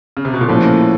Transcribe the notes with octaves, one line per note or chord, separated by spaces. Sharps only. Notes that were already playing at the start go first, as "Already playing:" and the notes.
C#3
C3
B2
A#2
A2 F3 A#3 C#4